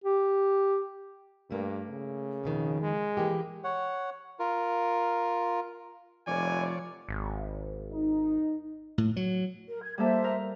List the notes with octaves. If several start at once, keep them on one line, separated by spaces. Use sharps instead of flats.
G4
G2 A3 A#3
C#3
F2 B2 D#3
G#3
E3 A#3 G4
C#5 F#5
F4 A#4
F1 F3 C#5 D5 G#5
G#1
D#4
A2
F#3
A#4
G#6
G3 A#3 A4 C5 E5
A#4